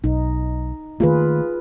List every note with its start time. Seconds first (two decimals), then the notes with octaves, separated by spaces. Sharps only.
0.04 B1 D#4
1.00 D#3 A3 A#3 F4 G#4 B4